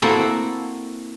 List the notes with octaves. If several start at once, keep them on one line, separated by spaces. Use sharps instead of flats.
A#3 C4 E4 F#4 A4